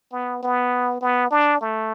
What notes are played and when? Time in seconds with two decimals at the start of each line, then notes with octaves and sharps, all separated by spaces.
0.12 B3
0.42 B3
1.01 B3
1.31 D4
1.61 A3